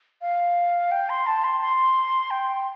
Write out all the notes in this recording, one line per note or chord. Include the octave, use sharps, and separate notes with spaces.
F5
G5
C6
A5
C6
C6
G5